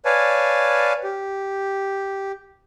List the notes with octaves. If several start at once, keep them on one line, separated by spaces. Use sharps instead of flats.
B4 C#5 D5 F5 G#5 A5
G4